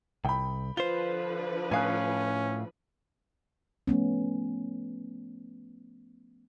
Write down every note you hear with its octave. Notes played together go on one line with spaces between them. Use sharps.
C2 G5 B5
D3 F3 F4 B4 C5 G7
A2 C#4 F5 G#5 D#6 F#6
F3 A3 B3 C#4